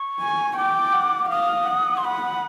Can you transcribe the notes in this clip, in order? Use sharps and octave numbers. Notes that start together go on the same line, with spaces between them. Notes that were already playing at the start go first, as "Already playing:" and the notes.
Already playing: C#6
G#5
C#6
G5 D6
F#5
F5 D#6
F#5
C6
F#5 B5